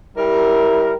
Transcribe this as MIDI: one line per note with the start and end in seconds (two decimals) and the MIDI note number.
0.17 0.93 55
0.17 0.93 64
0.17 0.93 67
0.17 0.93 70